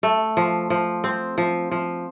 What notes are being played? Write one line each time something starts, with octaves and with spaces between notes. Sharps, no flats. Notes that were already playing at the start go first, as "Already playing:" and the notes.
A3
F3
F3
C4
F3
F3